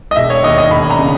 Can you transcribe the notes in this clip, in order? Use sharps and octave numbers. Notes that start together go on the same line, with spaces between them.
D#5
E1 E5
C#5
D#2 D#5
D#5
E1 B5
A#5
C#3